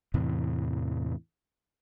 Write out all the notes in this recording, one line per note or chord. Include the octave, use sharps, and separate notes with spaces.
E2 A2 C3 E3